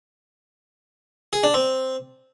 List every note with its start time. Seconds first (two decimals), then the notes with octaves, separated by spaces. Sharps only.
1.33 G#4
1.43 D4
1.54 C4